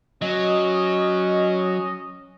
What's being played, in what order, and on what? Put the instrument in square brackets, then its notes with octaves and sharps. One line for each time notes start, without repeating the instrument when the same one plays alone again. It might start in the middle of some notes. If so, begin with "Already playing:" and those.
[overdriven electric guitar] F#3 [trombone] C#4 [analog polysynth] D#5